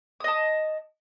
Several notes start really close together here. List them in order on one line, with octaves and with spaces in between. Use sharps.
D#6 D#5 A5